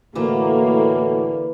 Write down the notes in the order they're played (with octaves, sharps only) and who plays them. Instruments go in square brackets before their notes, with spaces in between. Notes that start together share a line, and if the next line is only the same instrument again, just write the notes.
[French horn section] A2 F#4 [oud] D3 A3 [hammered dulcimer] E3 [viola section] A#3